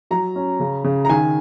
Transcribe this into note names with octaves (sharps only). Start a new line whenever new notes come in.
F#3 A#5
C#4
C#3
C#3
A#5
D#3 G#5